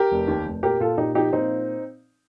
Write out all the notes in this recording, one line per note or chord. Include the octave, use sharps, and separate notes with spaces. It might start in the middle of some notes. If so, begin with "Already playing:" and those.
Already playing: G4 A#4
F1
D#2
F1
A#2 G4 A#4
A#2 F4 A4
A#2 D#4 G4
F3 D#4 G4
A#2 C4 D#4